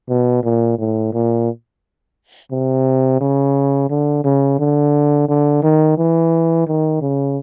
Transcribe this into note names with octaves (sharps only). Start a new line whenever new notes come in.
B2
A#2
A2
A#2
C3
C#3
D3
C#3
D3
D3
D#3
E3
D#3
C#3